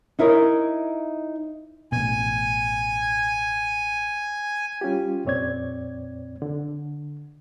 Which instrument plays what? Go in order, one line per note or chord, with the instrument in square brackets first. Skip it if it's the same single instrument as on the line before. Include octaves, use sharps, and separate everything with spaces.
[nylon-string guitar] D#4 E4 A#4 C#5 D#5
[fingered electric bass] A1 B2 [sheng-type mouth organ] G#5
[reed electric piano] G3 C#4 F4 G4
F2 A#2 C4 C#5 D5 G#6
D3